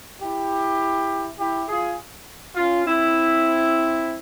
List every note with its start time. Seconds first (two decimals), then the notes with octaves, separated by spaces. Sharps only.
0.22 E4 G4
1.39 E4 G4
1.68 F4 G#4
2.56 C#4 F4
2.85 C4 E4